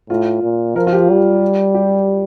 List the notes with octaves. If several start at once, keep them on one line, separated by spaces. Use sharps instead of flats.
A2 F4
A#2
F3 A#4
F4
G4
G3
G4